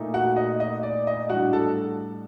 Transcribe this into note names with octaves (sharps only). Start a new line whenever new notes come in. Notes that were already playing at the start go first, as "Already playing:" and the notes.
Already playing: A#2 A3 D#4
F#4 F#5
D#5
D#5
D5
D#5
A2 G3 D4 F#4 F#5
A4 A5